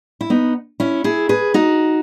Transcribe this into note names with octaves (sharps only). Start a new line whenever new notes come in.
E4
B3 D#4
C#4 E4
E4 G#4
G#4 B4
D#4 F#4